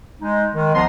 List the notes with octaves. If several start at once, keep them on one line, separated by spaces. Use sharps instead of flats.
G#3 D#4
D#3 G#3
C2 F3 B3 D#5 A#5 C6